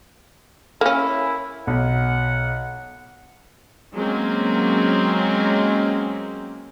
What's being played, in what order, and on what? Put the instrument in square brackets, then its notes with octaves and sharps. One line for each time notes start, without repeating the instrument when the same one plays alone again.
[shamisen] A#3 C#4 [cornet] E4
[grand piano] B1 [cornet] F#5
[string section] F#3 G#3 A#3 C4 C#4